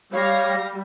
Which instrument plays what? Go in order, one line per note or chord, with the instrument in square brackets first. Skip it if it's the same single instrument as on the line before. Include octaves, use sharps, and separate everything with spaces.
[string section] G3 [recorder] C#5 [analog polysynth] F5 A#6